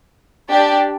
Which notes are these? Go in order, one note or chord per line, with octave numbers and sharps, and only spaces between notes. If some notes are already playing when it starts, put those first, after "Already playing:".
D4 G4 D5